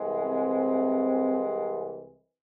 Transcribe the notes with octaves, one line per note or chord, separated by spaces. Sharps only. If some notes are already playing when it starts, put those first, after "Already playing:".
Already playing: C2 C3 E3 G#3
C4